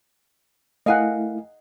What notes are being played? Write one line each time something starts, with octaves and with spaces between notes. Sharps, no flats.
A3 E4 A#4 D#5 F5 F#5 G#5